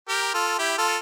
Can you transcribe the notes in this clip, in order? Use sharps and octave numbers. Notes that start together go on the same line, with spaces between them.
G4 A#4
F4 A4
E4 G4
F4 A4